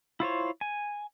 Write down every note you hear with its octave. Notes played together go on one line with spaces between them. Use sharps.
E4 F4 C5 C#5
G#5